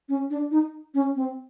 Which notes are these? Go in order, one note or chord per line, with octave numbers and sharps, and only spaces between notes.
C#4
D4
D#4
C#4
C4